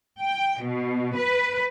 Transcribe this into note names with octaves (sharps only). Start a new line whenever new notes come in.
G5
B2
B4